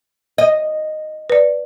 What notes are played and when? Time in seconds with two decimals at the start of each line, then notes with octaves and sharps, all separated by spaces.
0.38 D#5
1.30 B4 D5